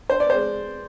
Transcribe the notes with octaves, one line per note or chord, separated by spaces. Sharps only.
D4 C5
D5
G#3 C5